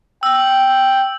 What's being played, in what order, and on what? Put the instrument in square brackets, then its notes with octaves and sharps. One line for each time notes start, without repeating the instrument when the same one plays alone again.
[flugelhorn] G5 [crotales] E6